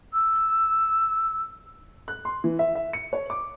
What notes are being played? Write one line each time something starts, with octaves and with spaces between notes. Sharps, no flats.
E6
F#6
C6
E3
E5
E5
C#7
C#5
D6